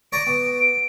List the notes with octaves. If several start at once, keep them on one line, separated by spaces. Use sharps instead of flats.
C#5 D5 A#5 D7
B3